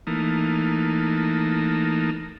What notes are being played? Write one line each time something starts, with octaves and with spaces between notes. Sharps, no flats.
E3 A3 A#3 D#4